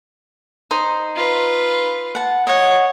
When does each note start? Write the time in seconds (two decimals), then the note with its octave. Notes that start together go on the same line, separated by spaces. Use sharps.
0.71 D#4 C5
1.16 F4 B4
2.15 F#5 A5
2.47 C#5 D#5 F#5 C#6